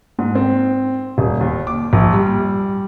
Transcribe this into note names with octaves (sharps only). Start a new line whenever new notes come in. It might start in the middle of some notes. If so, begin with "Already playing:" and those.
G#2
C4
D#1
D#2
D6
A#1
G3